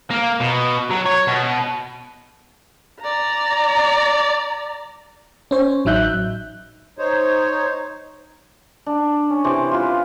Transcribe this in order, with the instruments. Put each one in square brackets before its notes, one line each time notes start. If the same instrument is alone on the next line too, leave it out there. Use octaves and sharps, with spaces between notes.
[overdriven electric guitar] A#3
B2
F#3
C#5
B2
[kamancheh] D5 A#5
[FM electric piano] C#4 C5 C#5
A1 F#3 D#4 E5 F#6 G6
[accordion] D#4 C5 C#5
[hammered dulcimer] D4
C#4
C3 E3 C5 D6
F4 B4